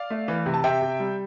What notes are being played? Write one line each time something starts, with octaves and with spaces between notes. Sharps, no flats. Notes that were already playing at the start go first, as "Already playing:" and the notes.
Already playing: D5 F5
A3
E3
C3
A5
C3 E5 G5
C3
G3